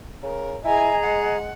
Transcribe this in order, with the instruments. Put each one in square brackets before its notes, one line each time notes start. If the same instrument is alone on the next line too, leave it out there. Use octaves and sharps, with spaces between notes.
[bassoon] C#3 [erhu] A#4
[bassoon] E4 [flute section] G#4 D#5 A#5 [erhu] G#5
[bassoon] G#3 [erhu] F#5